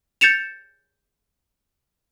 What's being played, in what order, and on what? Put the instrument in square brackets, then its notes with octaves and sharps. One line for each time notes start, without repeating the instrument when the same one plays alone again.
[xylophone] G6 A6 C#7 E7 F7